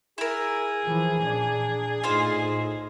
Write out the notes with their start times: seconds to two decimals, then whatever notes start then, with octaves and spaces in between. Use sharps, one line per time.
0.18 E4 G#4 A#4
0.85 E3 F3
1.22 A#2 D4
2.04 A2 D#4 F4 C5